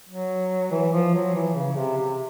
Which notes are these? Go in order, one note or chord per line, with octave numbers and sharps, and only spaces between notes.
F#3
E3
F3
F#3
E3
C#3
C3
C3